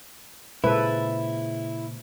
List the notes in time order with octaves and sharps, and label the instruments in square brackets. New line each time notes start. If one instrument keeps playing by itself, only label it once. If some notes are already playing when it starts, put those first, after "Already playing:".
[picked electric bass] A#2 C#3 [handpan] G#3 C5 [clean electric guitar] E4 [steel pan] A4 B4